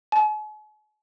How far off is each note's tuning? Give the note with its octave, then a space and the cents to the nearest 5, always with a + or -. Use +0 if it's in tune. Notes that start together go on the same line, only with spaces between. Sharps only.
G#5 +45